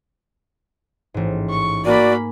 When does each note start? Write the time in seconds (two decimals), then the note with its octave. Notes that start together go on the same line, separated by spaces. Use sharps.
1.14 A1 G#2
1.49 C#6
1.85 A#3 F#4 D5 G#5 B5